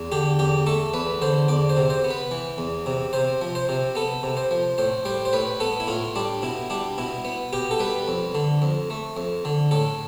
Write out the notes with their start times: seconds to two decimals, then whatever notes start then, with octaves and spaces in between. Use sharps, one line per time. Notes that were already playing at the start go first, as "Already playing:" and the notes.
Already playing: E2
0.12 D3 G4
0.39 E2 G4
0.66 A3 A4
0.94 E2 B4
1.22 D3 C5
1.48 E2 D5
1.69 C5
1.77 C3
1.90 C5
2.04 B3
2.11 B4
2.31 E3
2.58 E2
2.86 C3
3.13 C3 C5
3.42 F3
3.55 C5
3.69 C3
3.95 B3 A4
4.23 C3
4.37 C5
4.51 F3
4.78 A2 C5
5.05 G3 C5
5.25 C5
5.33 A2 B4
5.60 B3 A4
5.80 E4
5.87 A2 F4
6.16 G3 D4
6.42 B2 E4
6.70 G3 D4
6.98 B2 E4
7.25 B3
7.53 B2 G4
7.71 A4
7.79 G3 B4
8.08 F2
8.35 D3
8.62 F2
8.90 A3
9.17 F2
9.45 D3
9.71 A2 A4